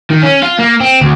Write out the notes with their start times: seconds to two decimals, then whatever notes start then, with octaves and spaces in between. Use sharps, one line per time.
0.10 D#3
0.23 C#4
0.43 F4
0.59 A#3
0.81 C4
1.01 D2